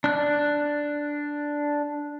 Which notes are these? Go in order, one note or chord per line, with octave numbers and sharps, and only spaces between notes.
D4 F#6